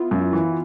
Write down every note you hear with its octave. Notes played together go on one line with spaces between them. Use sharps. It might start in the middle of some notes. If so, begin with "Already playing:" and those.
Already playing: B3 E4 F4
F#2
E3